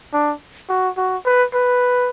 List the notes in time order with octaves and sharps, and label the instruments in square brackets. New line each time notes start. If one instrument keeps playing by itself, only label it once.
[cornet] D4
F#4
F#4
B4
B4